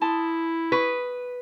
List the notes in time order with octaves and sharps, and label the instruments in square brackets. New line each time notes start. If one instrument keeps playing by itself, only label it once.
[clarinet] E4 [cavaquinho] A5 C6 D#6
[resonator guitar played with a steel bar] B4 [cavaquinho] C#6 D#6